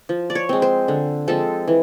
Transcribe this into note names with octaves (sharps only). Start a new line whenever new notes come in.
F3
D5
C#5
G#3 C4
C5
D3
F3 G#3 C4 A4
E3